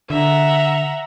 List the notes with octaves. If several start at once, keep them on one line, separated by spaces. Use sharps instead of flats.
D3 E5 F#5 A#5